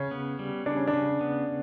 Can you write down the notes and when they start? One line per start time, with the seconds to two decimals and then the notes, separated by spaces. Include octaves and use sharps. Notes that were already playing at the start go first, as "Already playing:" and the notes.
Already playing: C#3 C#4
0.11 B3
0.39 G3
0.66 C#3 D4
0.77 C#4
0.88 D4
0.94 C#3
1.21 B3